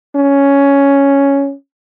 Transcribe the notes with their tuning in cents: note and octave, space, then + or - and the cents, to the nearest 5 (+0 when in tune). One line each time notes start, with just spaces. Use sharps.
C#4 +5